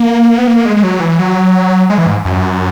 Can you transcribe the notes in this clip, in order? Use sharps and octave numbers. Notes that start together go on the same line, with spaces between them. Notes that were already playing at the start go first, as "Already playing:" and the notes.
Already playing: A#3
B3
A#3
G#3
G#3
F#3
E3
F#3
G#3
E3
G#2
F#2